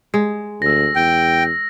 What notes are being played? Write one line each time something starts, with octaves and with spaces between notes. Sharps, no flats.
G#3
D2 E6 A#6
E2 G5